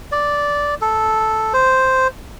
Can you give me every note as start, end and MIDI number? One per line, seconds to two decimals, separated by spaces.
0.12 0.75 74
0.81 1.53 69
1.53 2.08 72